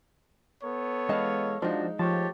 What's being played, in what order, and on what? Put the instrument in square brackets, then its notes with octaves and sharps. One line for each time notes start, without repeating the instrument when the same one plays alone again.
[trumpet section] B3 A4 C#5
[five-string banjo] E3 D#5 A5 [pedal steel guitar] G#3 F5
[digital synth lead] F3 [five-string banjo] G#3 D#4 [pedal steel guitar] D4 F#4
[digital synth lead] F3 [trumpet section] A3 G4 C#5 [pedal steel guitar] A5